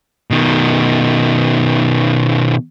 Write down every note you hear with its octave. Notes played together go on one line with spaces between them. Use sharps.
B2 D#3